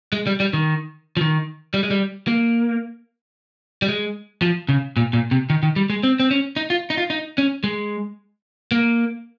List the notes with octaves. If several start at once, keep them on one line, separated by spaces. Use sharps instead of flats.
G#3
G3
G3
D#3
F3
D#3
G3
G#3
G3
A#3
G3
G#3
F3
C#3
A#2
A#2
C3
D#3
D#3
G3
G#3
C4
C4
C#4
D#4
F4
D#4
F4
D#4
C#4
G#3
A#3